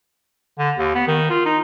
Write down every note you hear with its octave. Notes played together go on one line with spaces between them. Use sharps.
D3
D#2
B3
D#3
F4
D#4